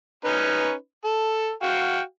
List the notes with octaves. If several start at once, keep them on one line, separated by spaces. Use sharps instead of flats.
C#4 D#4 B4
A4
F#4 F5 G5